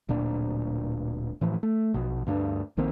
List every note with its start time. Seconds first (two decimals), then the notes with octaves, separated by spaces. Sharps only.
0.09 D1 A#2 D4
1.41 A2 E3 F3
1.63 A3
1.94 A#1 B2
2.27 D2 G2 G3 D4
2.77 A#1 D#3 A#3 C4